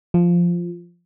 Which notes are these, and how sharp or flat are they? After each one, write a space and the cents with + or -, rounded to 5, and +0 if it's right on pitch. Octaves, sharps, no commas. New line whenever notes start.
F3 -5